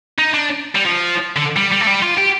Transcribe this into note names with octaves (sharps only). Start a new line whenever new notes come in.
D#4
D4
G3
F3
D3
G3
G3
A3
G3
F4
G4